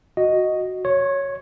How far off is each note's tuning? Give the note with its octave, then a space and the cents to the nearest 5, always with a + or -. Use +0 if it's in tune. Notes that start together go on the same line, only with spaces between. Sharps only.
F#4 +0 D#5 +0
C#5 +0 C#6 -45